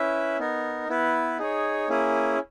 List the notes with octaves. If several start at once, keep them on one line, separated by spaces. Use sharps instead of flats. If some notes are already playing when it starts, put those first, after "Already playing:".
Already playing: C#4 E4 B4 E5
B3 D#4 A#4
B3 E4 B4
D#4 G#4 C#5
A#3 C#4 E4 G#4